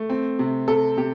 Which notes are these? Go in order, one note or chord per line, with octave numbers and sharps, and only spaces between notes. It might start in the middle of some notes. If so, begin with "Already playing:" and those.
Already playing: A3
C4
C3
C3 A4
C3 G4